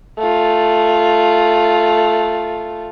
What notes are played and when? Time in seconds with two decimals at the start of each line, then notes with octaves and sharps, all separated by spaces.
0.19 A3 F4